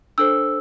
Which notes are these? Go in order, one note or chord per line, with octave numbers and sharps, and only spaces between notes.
D4 A4 C5 E6